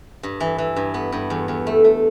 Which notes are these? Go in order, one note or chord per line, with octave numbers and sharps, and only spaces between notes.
G2
E3
E3
G2
B3
G2
E2
E2
A3
A3